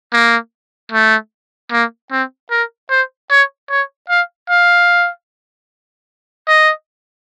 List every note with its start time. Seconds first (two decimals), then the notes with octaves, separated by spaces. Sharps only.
0.13 A#3
0.92 A3
1.71 A#3
2.11 C4
2.51 A#4
2.90 C5
3.30 C#5
3.70 C#5
4.09 F5
4.49 F5
6.48 D#5